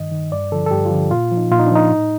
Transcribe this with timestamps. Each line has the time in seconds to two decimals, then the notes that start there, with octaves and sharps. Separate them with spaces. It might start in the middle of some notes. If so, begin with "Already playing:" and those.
Already playing: G2 D#3 D#5
0.12 D#3
0.32 G2 D5
0.52 D3 F3 A4
0.66 A4
0.71 G2 G4
0.85 F4
0.91 D3 F3
1.11 A#2 F4
1.31 F3
1.37 D#4
1.51 A#2 F4
1.59 D#4
1.67 D4
1.72 F3 D#4
1.91 A2